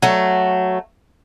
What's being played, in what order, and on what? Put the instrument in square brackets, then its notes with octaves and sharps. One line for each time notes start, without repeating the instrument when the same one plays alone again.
[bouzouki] F#3 A3